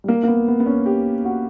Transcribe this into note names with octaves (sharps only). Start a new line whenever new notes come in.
G3
A#3
A#3
B3
B3
B3
C#4
G4
F#4